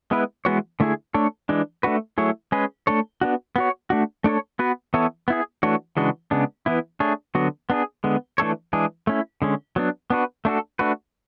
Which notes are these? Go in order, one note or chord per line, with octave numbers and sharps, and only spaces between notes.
G#3 B3 E4 B4
E3 G#3 B3 F#4 C#5
D3 A3 E4 G#4
A3 D4 A4 C#5
E3 G#3 D4
A3 D4 F#4 B4
F#3 A3 E4 G#4 C#5
G#3 C#4 G#4 B4
A3 D4 A4 C#5
B3 D4 F#4
B3 F#4 C#5
A3 D4 F#4
A3 D4 A4 C#5
B3 F#4 B4
E3 B3 E4 A4 C#5
B3 E4 G#4
E3 A3 D4 F#4 C#5
C#3 E3 G#3 D4 F#4
C#3 G#3 B3 D4
E3 B3 E4
A3 D4 G#4 C#5
D3 F#3 B3 F#4
B3 D4 G#4
D3 G#3 B3
E3 A3 D4 A4 C#5
E3 G#3 D4 G#4
A3 C#4 E4
D3 G#3 C#4
F#3 B3 D4
B3 D4 F#4 B4
A3 D4 F#4 A4
A3 D4 F#4 B4